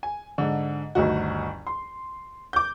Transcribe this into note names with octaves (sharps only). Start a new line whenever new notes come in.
G#5
G#2 D3
G1 D2 D#3 F#4
C6
D6 G6